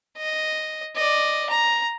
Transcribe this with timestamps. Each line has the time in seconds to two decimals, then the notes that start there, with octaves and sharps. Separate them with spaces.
0.18 D#5
0.96 D5 D#5
1.50 A#5